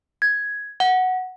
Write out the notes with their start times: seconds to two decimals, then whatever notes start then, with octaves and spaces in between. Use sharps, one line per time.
0.22 G#6
0.80 F#5